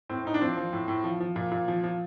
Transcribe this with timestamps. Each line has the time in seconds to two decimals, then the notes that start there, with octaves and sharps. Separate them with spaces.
0.09 A2 C4
0.25 A2 D#4
0.34 D4
0.41 F3 C4
0.57 F3
0.73 A2
0.88 A2
1.04 F3
1.20 F3
1.36 A#2
1.52 A#2
1.68 F3
1.84 F3